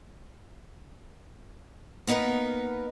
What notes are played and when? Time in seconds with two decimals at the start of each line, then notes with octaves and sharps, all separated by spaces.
2.07 A#3 B3 D#4 A#4 B4